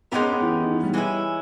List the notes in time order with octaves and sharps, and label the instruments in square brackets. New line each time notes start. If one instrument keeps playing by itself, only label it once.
[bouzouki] G#3 D#4 G4 A#4 [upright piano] B3
[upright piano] C#4
B3
E3
E3
D#3
E3
G3
[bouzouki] E3 G#3 C#4 E4